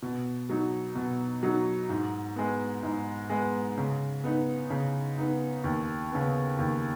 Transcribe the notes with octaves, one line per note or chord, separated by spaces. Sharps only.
B2
F#3 D#4
B2
F#3 D#4
G#2
G#3 B3
G#2
G#3 B3
C#3
B3 D#4
C#3
B3 D#4
D#2
C#3 B3
D#2